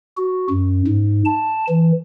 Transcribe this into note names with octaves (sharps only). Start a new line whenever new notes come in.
F#4
F#2
G#2
A5
E3